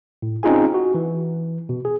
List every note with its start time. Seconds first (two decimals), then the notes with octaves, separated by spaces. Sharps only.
0.22 A2
0.43 C4 C#4 D#4 F4 G#4 G#5
0.74 F#4
0.95 E3
1.69 B2
1.85 G#4